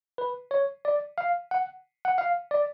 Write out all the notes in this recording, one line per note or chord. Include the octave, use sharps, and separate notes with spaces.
B4
C#5
D5
F5
F#5
F#5
F5
D5